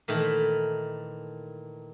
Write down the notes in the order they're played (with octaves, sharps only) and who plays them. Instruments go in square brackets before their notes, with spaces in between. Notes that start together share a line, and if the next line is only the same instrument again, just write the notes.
[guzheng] A#2 D#3 E3 A3